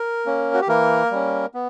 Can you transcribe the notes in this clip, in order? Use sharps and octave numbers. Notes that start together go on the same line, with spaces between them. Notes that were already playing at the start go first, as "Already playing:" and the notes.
Already playing: A#4
A#3 C#4
F#4
G4
E3 A#3 A#4
G3 C#4
B3